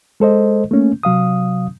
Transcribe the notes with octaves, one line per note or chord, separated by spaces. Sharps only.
G#3 A4 C5 D#5
A3 A#3 C#4
C3 F#3 F5 D#6